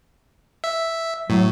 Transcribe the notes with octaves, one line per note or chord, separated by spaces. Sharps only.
E5
A2 F#3